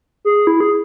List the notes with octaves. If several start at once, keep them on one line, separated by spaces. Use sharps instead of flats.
G#4
E4
G#4